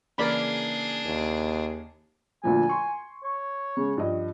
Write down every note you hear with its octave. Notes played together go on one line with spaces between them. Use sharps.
C#3 E3 A#3 D4 G#4 A#4 D5 B5
D#2
D2 A#2 F3 G#5
C6 C#6
C#5
C#3 G#3
G2 F3 D#5